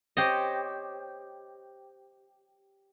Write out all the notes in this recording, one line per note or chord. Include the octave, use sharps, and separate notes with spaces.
G4 C5 C#5 D#5